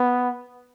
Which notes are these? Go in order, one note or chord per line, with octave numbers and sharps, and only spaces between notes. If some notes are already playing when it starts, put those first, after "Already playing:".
Already playing: B3